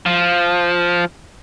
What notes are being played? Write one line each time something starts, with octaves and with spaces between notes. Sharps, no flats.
F3